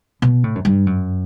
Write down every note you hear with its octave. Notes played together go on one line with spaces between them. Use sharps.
B2
A2
F#2
G2
F#2